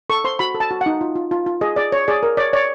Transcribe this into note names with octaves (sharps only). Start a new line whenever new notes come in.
A4 C#6
C5 C6
F#4 B5
A4
A5
F#4
F#5
D#4
F4
F4
F4
F4
G#4 D#5
G#4 D5
C#5
G#4 D5
A#4
C#5 D5
C#5 D5